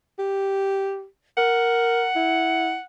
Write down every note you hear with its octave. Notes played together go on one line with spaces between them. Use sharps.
G4
A#4 F#5
E4